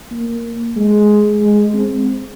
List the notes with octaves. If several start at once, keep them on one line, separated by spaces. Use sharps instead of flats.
A#3
G#3
G#3
C4